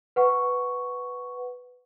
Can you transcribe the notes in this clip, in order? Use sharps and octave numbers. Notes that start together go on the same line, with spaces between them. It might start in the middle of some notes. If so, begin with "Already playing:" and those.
B4 F#5 C#6